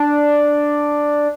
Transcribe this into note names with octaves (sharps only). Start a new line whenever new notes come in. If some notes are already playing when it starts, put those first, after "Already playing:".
Already playing: D4